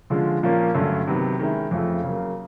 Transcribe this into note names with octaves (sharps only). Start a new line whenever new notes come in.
D3 F3 G#3 C#4 F4
A#2 F3 A#3 C#4
G2 D3 F#3 A3 C#4
C3 D#3 F#3 B3
D#3 G#3 C#4 E4
F2 C#3 F3 A3
C#3 F#3 A#3